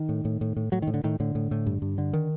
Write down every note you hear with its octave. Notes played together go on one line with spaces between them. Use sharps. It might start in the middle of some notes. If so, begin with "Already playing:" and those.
Already playing: D#3
A2
A2
A2
A2
A2 F#3
A2 D#3
D3
A2 D#3
A2 D3
A2
A2
G2
G2
D3
D#3